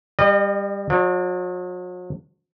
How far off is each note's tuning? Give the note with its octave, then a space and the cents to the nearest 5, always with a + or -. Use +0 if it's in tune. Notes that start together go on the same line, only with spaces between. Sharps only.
G3 +20 D#5 -35
F#3 -45 D5 +20